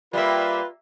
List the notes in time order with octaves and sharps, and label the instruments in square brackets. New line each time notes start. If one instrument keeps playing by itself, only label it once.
[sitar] G3 A#3 [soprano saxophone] F4 [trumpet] B4 [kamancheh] E5